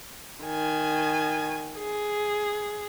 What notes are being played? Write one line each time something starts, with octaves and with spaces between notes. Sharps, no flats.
D#3 G#5
G#4